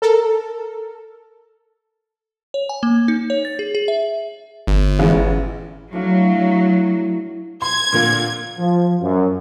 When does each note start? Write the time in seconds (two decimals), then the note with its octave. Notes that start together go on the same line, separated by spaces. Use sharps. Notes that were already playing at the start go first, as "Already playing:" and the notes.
0.02 A4 A#4
2.54 C#5
2.69 G#5
2.83 A#3
3.08 D#4
3.30 C#5
3.45 A6
3.59 G#4
3.75 G#4
3.88 E5
4.67 G1
4.99 A1 G#3
5.93 A2 F#3 D4 F5
7.62 C6 G#6
7.93 A#2 D3 A#3
8.58 F3
9.01 F#2